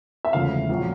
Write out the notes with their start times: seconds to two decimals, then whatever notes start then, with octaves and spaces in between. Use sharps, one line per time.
0.25 E5
0.33 E1 D2 C#3 F3 F5
0.69 A#1 A#2 F#3